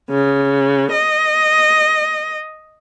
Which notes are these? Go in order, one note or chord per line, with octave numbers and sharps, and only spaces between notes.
C#3
D#5